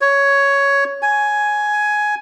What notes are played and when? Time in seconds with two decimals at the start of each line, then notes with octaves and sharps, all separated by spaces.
0.01 C#5
1.02 G#5